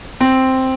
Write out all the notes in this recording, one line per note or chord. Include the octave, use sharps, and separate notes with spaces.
C4